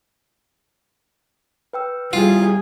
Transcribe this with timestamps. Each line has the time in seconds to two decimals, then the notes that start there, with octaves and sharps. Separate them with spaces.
1.73 B4 G5 E6
2.13 G3 E4 F4 G#4